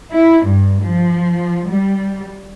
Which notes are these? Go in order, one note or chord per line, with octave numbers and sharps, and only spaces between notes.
E4
G2
F3
G3